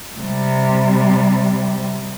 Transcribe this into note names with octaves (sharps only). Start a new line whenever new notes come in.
C3 G3